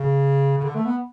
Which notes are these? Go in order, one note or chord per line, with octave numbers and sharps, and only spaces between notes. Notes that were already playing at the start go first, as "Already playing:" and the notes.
Already playing: C#3
C#3
D3
A3
B3